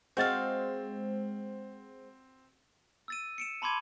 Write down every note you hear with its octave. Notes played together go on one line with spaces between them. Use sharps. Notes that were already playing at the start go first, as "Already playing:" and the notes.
G#3 C4 F#4 C5 F5 A6
E6 A6 D#7
C#7 D7 E7
A5 B5 C6 D6 G#6 D#7